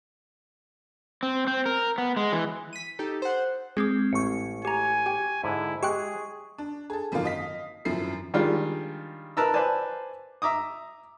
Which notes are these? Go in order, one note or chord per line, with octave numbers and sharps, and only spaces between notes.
C4
C4
A#4
B3
G#3
E3
B6 D#7
D#4 G4 A4
C5 F#5
G#3 C4 G#4 D6
A1 C#6 C#7
G4 G#5 A#5
G4 G5
G#2 D3 E4
G#3 G4 G#4 G5 C#6 F#6
D4
G#4 A4
G#1 F#2 D#3 F3 A#3 F5
D#5 F5 B6
G#1 F#2 F3 E4 C7
D#3 G3 G#3 D4 F4
A#4 B4 A5 A#5 E6
B4 C5 D5 G#5 A5
E5 A#5 D6 D#6